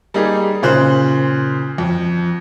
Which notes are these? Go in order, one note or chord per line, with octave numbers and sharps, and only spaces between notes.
G3 A#3 D#4 G#4
A#2 C#3 C5 F#6
F2